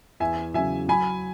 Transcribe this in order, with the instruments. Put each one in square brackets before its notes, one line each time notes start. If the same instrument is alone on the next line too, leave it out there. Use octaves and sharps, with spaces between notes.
[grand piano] E2 [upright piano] E5 G#5
[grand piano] C#3 F#3 [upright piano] E5 G#5
[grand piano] F#3 [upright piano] G#5 B5